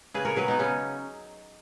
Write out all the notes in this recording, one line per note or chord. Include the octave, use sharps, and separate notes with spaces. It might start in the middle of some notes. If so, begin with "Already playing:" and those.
C#3 G#4 B4
A#4 C#5
F#3 G#4 B4
B3 D#4
C#3 C#4